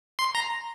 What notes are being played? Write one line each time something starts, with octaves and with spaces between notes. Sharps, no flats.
C6
A#5